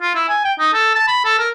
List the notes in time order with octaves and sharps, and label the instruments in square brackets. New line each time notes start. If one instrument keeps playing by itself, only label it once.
[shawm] F4
E4
G#5
G5
D#4
A4
A5
B5
A4
A#4